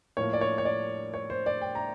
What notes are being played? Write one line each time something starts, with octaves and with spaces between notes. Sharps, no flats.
A2 F3 A#3 C#5
D5
C#5
C#5
D5
C#5
C5
D5
G5
A#5